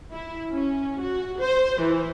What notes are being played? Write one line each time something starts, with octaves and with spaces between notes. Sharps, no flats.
E4
C#4
F#4
C5
E3